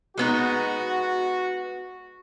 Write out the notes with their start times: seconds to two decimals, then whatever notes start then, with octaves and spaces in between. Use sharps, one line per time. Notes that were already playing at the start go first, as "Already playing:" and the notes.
0.18 G#3 B3 D#4 F#4